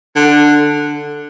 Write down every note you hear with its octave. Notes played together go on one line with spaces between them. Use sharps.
D3